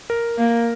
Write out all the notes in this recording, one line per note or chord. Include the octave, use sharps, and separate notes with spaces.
A#4
A#3